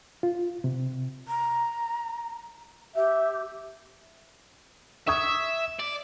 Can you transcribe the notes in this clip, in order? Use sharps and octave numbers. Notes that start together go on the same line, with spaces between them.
F4
C3
A#5
G4 E5
E5 C#6 D#6 G#6
D5